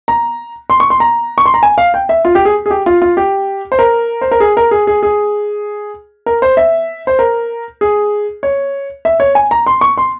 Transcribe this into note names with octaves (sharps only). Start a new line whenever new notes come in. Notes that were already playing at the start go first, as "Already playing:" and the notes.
A#5
C6
C#6
C6
A#5
C#6
C6
A#5
G#5
F5
G5
E5
F4
G4
G#4
G#4
G4
F4
F4
G4
C5
A#4
C5
A#4
G#4
A#4
G#4
G#4
G#4
A#4
C5
E5
C5
A#4
G#4
C#5
E5
C#5
G#5
A#5
C6
C#6
C6